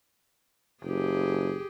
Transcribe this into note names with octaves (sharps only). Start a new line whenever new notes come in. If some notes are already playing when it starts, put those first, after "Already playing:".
F#1 G4 G#4